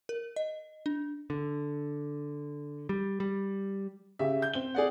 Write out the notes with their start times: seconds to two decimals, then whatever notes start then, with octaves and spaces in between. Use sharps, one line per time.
0.09 A#4
0.36 D#5
0.86 D4
1.30 D3
2.89 G3
3.20 G3
4.19 C#3 G4 E5
4.42 G6
4.54 C4 G7
4.75 G#4 D5 F#5